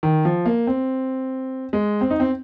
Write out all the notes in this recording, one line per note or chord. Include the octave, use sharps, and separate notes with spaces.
D#3
F3
A#3
C4
G#3
C4
D#4
C4